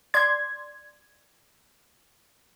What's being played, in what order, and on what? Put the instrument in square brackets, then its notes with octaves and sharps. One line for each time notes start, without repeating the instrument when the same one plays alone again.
[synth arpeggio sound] D5 C6 G#6